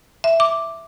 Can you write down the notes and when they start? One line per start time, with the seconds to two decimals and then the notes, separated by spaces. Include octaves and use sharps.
0.24 E5
0.40 D6